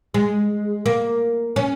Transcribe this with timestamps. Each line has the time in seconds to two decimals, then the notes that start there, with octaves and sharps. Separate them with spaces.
0.14 G#3
0.86 A#3
1.56 C#4